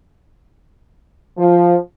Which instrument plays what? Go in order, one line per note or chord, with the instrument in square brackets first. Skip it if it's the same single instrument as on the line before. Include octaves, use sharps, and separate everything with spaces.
[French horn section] F3